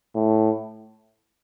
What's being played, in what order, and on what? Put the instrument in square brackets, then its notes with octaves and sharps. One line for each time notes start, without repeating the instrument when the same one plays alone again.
[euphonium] A2